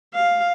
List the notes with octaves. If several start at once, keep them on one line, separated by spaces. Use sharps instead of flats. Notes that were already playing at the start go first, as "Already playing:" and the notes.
F5